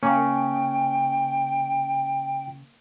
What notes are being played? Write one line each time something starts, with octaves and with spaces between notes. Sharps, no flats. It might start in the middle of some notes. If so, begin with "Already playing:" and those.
C#3 A#3 C#4 G5